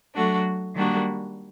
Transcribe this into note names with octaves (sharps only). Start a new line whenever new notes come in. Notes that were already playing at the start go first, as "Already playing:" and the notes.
F#3 A3 D4 F#4
D#3 G3 A#3 D4 F#4